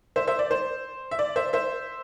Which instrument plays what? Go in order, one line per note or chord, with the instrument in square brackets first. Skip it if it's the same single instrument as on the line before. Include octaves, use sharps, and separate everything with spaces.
[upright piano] C5 E5
C5 E5
D5
C5
E5
D5
C5 E5
C5 E5